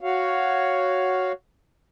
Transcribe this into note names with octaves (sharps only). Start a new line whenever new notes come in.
F#4 C#5 F5